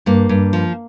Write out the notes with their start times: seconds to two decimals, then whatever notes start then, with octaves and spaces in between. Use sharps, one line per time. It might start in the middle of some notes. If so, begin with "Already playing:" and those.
0.06 G2 A#3
0.29 G2
0.53 F3